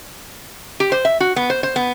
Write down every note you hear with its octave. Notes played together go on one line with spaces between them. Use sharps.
G4
C5
E5
F#4
B3
C5
C5
B3